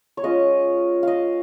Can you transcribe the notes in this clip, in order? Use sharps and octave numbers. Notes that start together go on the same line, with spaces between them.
C#5
G#3 C#4 F4 D#5
D#5 F5